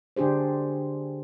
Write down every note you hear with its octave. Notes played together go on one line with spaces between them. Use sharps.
D3 D4 G4 G#4 C5